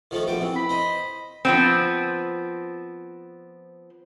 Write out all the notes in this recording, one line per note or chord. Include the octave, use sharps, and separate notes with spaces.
D#3 F3 A3
A#1 B2 G5
E3 C4
B5
C5 D#5
F3 B3 C4